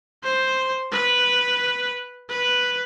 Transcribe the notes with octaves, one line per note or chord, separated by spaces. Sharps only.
C5
B4
B4